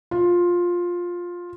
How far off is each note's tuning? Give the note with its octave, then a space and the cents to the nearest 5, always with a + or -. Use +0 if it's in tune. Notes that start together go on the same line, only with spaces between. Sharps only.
F4 +10